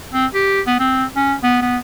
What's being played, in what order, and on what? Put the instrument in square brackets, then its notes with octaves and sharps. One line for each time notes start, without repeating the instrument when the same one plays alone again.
[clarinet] C4
G4
B3
C4
C#4
B3
B3